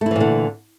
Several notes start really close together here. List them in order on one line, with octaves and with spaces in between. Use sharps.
A3 E4 E3 A#2 D3